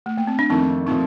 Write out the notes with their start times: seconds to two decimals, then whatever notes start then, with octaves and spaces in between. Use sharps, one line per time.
0.06 A3
0.17 A#3
0.27 C4
0.39 D4
0.50 F2 D#3 A3 C4 D#4
0.87 A#2 F3 A3 C4 D#4